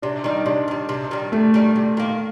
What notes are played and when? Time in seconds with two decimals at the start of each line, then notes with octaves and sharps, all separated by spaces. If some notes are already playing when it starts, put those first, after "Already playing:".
0.02 C3 D4
0.24 D#3 G3 D#4
0.46 C3 D4
0.68 D#3 G3
0.89 C3
1.11 D#3 G3
1.32 C3 A3
1.54 D#3 G3
1.76 C3
1.97 D#3 A#3